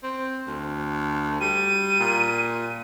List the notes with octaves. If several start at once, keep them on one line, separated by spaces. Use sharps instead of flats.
C4
D2
G3 D#7
A#2